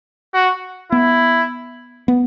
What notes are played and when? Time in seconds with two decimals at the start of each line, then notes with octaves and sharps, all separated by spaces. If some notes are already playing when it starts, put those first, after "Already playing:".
0.34 F#4
0.92 B3 E4
2.08 B3